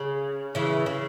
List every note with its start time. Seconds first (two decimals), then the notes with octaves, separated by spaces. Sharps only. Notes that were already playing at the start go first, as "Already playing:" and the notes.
Already playing: C#3
0.55 C#3 E3
0.86 C#3